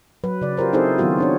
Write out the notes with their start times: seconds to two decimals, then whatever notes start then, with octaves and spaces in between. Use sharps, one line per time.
0.24 F#3 B4
0.41 C#3 D5
0.57 F4 G4 A#4 C5
0.73 C4 D#4 E4 G#4 A4 C5
0.98 D#3 F#3 B3 F4 F#4
1.18 C4 D4 C#5